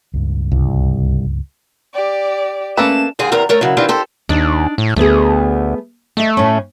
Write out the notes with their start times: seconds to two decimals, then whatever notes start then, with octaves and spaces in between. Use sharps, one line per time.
0.14 C#2 G2
0.52 C2
1.94 G4 D5
2.77 A3 A#3 C#4 A4 B4 A5 E7
3.19 D#2 G#2 C4 G#4 G#5
3.32 E2 C3 A#4 A#5
3.49 A3 A#4 C#5
3.61 C#3 F#3 E4
3.77 D#3 E3 C4 D4 F4 G4
3.89 G4 A4 C5
4.29 D#2 D4 D#4 D#5
4.78 A2
4.96 D2 A3 B3 G#4
6.17 A3 D#5 E5
6.37 A2 C#4